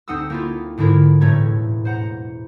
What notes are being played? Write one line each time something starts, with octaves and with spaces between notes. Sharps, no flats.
D2 C4 D#4 F#5 D#6 E6
A#3 E4 F4
G#2 D3 G#3 E4 F4 A#4
E1 A2 A3 C#4 A#5 G#6
C5 F#5 A#5